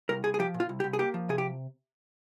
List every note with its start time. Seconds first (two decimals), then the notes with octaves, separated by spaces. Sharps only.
0.09 C2 A#4
0.24 C2 G#4
0.34 G#4
0.39 F3 G4
0.54 A#2
0.60 F4
0.69 C2
0.80 G4
0.84 C2
0.93 G#4
0.99 A#3 G4
1.14 F3
1.29 C3 G#4
1.38 G4